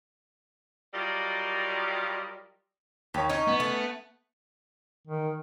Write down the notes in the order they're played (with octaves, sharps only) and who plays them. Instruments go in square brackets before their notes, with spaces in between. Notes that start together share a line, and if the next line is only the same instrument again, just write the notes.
[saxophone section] F#3 G3 F4 A#4 D5 D#5
[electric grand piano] D#2 C#5 [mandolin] G4
[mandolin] C#4 [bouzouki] D#4 [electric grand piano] G#6
[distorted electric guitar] B3
[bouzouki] A3
[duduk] D#3